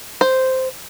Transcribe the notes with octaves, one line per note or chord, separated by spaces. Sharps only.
C5